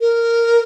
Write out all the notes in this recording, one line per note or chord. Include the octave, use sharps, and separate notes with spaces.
A#4